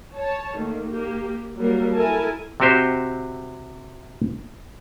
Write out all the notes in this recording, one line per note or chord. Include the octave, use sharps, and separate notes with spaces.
C#5 A5
D#3 A3 A#3
A#3 G4
F#3 G3 A#3 A#4
E4 A4 A#4 G#5 A5
C3 C4 F#4 G4 C5 D#5